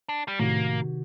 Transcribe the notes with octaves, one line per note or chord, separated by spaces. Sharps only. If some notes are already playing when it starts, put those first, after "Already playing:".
D4
G3
A2 C3 D#3 A#3 F#4